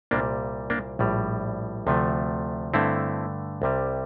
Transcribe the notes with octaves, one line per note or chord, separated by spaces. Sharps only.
C2 A#2 G3 A#3 D4
A#3 D4
A#1 A2 G3
D2 C3 F3 A3
G2 D3 A3 C4 E4
C2 C3 G3